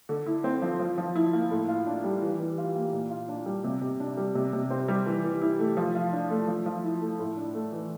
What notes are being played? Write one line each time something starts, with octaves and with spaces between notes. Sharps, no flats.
D3
E4
C4
F3
F3
F3
E4
A#3
A2
F4
D4
G3
E3
E3
F4
A#3
A#2
F4
D4
G3
C3
C3
D4
G3
C3
C3
C4
G3
E3
E3
E4
A3
F3
F4
D4
A3
F3
F3
E4
A3
A2
D4
A3
E3